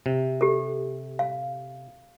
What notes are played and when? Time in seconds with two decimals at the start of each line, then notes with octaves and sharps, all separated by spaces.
0.06 C3
0.41 G4 A4
1.19 F5